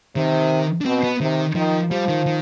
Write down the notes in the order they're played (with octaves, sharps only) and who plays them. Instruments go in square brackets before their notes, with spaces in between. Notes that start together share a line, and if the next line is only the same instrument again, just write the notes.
[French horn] C3 [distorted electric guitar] D#3
[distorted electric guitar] D4
[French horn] B2 [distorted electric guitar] C4
[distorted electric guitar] B3
[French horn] C3 [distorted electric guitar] D#3
[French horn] D#3 [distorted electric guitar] F3
[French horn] F3 [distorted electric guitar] G3
[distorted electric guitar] D#3
D#3